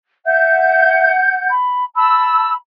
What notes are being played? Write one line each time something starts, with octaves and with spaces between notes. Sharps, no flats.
E5 F#5 G6
B5
A5 B5 E6